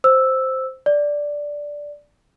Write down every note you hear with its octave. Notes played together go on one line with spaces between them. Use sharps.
C5 E6
D5